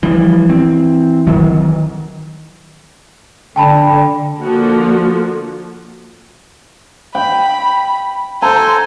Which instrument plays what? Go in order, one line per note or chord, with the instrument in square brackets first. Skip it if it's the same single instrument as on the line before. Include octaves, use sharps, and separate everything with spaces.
[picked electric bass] E3 [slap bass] F3 G3
[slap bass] C4
D#3 F#3
[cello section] D3 [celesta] G5 A5 B5
[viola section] D3 F3 A#3 F#4
[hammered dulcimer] G5 [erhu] B5
[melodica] A4 G#5 [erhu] C5 [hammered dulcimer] A#5